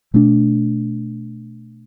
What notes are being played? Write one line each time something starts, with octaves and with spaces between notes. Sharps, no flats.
B2 A3 D4